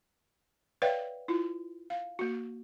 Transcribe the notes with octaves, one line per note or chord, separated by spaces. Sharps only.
B4 C#5 D5 E5 F5 G5
E4 F4
F5
A#3 F#4